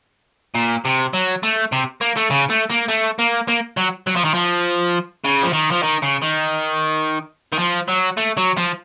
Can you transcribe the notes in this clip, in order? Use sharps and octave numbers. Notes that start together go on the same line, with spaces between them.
A#2
C3
F#3
A3
C3
A#3
A3
C#3
A3
A#3
A3
A#3
A#3
F#3
F#3
F3
D#3
F3
C#3
F3
D#3
F3
D#3
C#3
D#3
D#3
F3
F#3
A3
F#3
F3